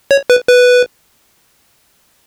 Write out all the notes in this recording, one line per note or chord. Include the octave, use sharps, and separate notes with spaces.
C#5
B4
B4